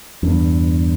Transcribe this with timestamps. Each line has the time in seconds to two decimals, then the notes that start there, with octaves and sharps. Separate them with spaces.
0.23 F2
0.27 E2 G2